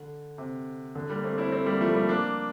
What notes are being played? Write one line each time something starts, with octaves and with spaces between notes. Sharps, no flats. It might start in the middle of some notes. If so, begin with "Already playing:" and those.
Already playing: D3
C3
D3
G3 A#3
A3 C4
C4 E4
A3 C4
G3 A#3
F3 A3
G3 A#3
A#3 D4